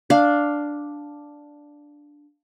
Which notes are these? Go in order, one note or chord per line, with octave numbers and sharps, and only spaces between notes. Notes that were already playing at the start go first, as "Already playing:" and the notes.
D4 F5